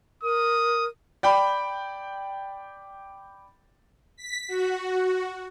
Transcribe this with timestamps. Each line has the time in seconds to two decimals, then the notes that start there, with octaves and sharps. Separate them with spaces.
0.23 A#4 D#6
1.23 D5 G5 B5
4.16 B6
4.47 F#4